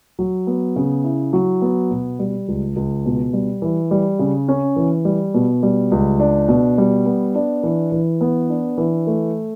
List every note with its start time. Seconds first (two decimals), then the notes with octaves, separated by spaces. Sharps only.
0.19 F#3
0.47 B3
0.76 C#3
1.04 E4
1.33 F#3
1.62 B3
1.91 B2
2.19 G3
2.48 C#2
2.76 C#2
3.06 B2
3.33 G3
3.62 E3
3.91 G3
4.19 C#3
4.48 C#4
4.76 E3
5.05 G3
5.34 B2
5.63 G3
5.91 C#2
6.20 D4
6.48 B2
6.78 G3
7.06 B3
7.35 D4
7.63 E3
7.92 E3
8.21 B3
8.49 D4
8.78 E3
9.07 A3